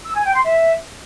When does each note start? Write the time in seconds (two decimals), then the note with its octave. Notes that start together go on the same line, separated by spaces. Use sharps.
0.05 E6
0.15 G#5
0.24 G5
0.34 C6
0.44 E5